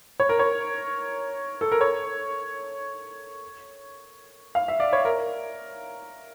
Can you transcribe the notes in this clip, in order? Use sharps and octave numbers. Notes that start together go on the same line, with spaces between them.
C#5
A#4
C#5
A4
A#4
C#5
F5
E5
D5
C#5
A#4